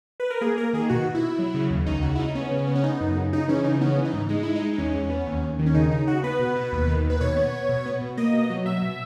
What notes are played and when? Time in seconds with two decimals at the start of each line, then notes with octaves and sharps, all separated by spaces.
0.20 B4
0.30 A#4
0.41 A#3 G#4
0.58 A#3 A#4
0.73 D#3 G#4
0.89 B2 F#4
1.06 B2
1.15 E4
1.23 B2
1.39 F#3
1.54 C#3
1.70 D#2
1.86 C#2 D#4
2.02 C#3 F#4
2.15 E4
2.19 C#3 D#4
2.35 B3 C#4
2.51 C#3
2.67 B3
2.75 C#4
2.83 B3 D#4
3.01 F#2
3.16 C#3
3.33 C#3 D#4
3.48 E3 C#4
3.64 C#3 D#4
3.81 B3 C#4
3.98 E3
4.05 D#4
4.13 G#2
4.29 G#3 D#4
4.43 G#3 E4
4.55 D#4
4.62 G#3
4.73 D#4
4.78 E2 C#4
4.95 E2
5.10 B3
5.27 D#2
5.42 D#2
5.59 D#3
5.66 C#4
5.74 C#3 D#4
5.91 C#3 D#4
6.07 C#3 F#4
6.23 B3 B4
6.39 B2
6.56 B2
6.72 D#2
6.88 D#3
7.04 D#2
7.10 B4
7.21 B2 C#5
7.36 B3
7.53 B3
7.69 B2
7.86 B3
8.01 B2
8.17 A#3 D#5
8.33 B2
8.50 F#3
8.66 B2 E5
8.82 B2